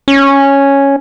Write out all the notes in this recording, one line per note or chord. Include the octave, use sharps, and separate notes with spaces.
C#4